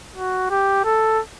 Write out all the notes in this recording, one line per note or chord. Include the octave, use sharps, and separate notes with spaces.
F#4
G4
A4